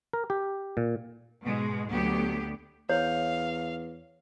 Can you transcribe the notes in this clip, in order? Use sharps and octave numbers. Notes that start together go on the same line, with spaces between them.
A#4
G4
A#2
G#2 B2 G#3
D2 F#3 B3 G4
E2 C#5 F5